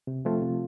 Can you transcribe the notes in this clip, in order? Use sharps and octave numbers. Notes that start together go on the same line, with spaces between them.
C3
F3 A3 C4 F4
C3